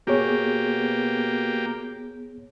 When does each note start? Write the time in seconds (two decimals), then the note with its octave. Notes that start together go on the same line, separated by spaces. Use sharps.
0.07 B2 A#3 B3 G4 G#4 C#5